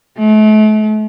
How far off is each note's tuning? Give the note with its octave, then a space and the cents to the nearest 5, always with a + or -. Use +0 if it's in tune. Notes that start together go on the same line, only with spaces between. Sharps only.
A3 -40